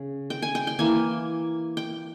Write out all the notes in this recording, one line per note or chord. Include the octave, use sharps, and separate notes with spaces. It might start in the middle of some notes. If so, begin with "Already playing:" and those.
Already playing: C#3
G5
G#5
G5
G5
E3 A#3 G#5
G5